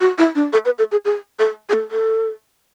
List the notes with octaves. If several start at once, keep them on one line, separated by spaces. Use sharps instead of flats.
F#4
E4
D4
A4
B4
A4
G#4
G#4
A4
G#4
A4
A4